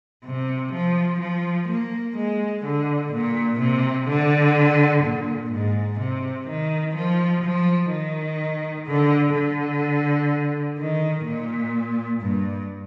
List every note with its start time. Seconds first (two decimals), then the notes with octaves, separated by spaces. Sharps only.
0.25 C3
0.73 F3
1.21 F3
1.68 A#3
2.17 G#3
2.65 D3
3.12 A#2
3.60 C3
4.08 D3
5.04 A#2
5.51 G#2
5.99 C3
6.48 D#3
6.95 F3
7.44 F3
7.92 D#3
8.87 D3
9.35 D3
10.79 D#3
11.25 A#2
12.22 G2